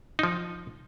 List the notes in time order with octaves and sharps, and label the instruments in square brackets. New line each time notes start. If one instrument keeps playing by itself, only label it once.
[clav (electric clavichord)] F3 D#4